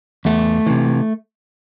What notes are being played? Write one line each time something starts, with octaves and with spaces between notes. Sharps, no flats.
E2 A3
C3 E3